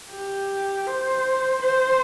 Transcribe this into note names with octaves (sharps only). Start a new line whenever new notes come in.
G4
C5
C5